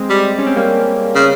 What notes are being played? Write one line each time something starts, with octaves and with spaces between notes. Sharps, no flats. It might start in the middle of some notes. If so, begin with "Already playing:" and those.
Already playing: G#3 C4
G3
C#4
C4
G3 A#3
C#3